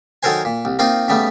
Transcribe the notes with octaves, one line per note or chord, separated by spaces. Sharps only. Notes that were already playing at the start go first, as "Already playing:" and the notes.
D#3 F#3 A4 A#4 C5 G#5
A#2
C2
A#3 C4 D#4 F4
C#3 G3 A3 B3